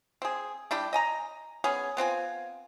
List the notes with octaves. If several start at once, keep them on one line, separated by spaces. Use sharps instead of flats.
C4 G#4
G3 D4 E4 G4
D#5 G#5 A#5
B3 C#4 G#4
B3 C4 F4 G#5